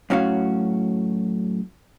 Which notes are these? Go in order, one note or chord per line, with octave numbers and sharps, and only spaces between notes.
F#2 A2 C#4 F#4 F5